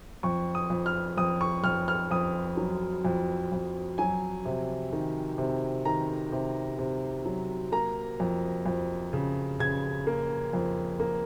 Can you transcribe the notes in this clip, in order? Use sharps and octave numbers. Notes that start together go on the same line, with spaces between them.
F2 C#6
D#6
F2
F6
F2 D#6
C#6
F2 F6
F6
F2 D#6
F#3
F2
F2
F#3 G#5
C3
D#3
C3
D#3 A#5
C3
C3
F#3
A#3 A#5
F2
F2
C#3
C#3 G#6
A#3
F2
A#3